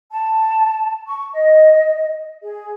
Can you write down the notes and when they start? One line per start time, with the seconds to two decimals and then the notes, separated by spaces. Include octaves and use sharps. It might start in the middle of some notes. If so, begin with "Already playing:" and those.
0.11 A5
1.07 C#6
1.32 D#5
2.41 G#4